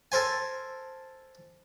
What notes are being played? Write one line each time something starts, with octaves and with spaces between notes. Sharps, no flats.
A4 A#4 C5 G#5